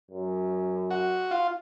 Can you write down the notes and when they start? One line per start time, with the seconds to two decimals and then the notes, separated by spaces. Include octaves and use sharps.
0.11 F#2
0.91 F#4
1.31 F4